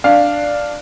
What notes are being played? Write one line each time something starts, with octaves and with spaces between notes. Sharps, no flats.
D4 F5